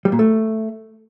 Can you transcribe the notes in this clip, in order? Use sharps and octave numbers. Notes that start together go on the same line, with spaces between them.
G3
A#2
A3